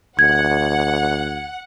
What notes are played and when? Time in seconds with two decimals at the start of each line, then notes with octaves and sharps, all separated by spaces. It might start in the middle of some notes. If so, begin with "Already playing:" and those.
0.19 D2 F#5 G#6